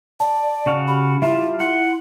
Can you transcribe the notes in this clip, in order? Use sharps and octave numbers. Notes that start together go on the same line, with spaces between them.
D5 A5
C#3 F#4 F5
G4 B5
G3 E4 F4 E5 A5
E4 F#5 C6